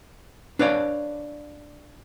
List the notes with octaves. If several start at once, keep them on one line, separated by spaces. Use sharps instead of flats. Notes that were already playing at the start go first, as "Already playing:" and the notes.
D4 B4 C#5 D5 F5